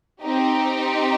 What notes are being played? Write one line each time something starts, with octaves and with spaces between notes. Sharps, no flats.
C4 D#4 G4